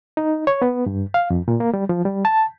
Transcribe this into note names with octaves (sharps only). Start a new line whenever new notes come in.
D#4
C#5
B3
G2
F5
F2
A#2
A#3
G3
F3
G3
A5